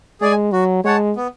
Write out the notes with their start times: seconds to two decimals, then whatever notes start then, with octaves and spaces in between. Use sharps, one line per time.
0.21 G#3 G#4 D5 G#5
0.52 F#3 F#4
0.84 G#3 C#5 F#5 A5
1.16 B3